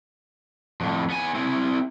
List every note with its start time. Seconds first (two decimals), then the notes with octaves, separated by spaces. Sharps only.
0.81 F2 A2
1.10 B3 G#5
1.35 C4 E4